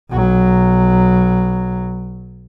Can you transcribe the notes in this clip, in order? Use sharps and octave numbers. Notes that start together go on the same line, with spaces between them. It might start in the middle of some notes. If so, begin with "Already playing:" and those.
B1 F#3